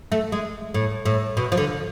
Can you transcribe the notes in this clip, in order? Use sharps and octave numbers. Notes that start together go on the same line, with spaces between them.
A3
G#3
A2
A2
B2
F3
D3